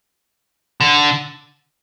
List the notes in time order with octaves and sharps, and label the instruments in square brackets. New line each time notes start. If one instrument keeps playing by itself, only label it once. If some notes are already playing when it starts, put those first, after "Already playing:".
[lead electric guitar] D3